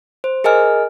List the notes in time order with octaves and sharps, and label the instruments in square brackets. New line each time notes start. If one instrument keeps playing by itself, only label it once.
[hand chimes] C5
G#4 A#4 D#5 G#5 F6